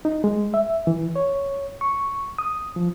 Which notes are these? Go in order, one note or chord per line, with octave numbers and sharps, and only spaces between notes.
D#4
G#3
E5
E3
C#5
C#6
D#6
F3